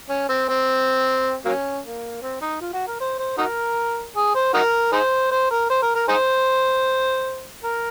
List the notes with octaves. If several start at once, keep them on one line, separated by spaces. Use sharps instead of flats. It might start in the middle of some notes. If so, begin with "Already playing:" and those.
C#4
C4
C4
F#3 A#3 C#4
A#3
C4
D#4
F4
F#4
A#4
C5
C5
D#4 F#4 A#4
G#4
C5
D#4 F#4 A#4
D#4 G#4 C5
C5
A#4
C5
A#4
A#4
D#4 G#4 C5
A#4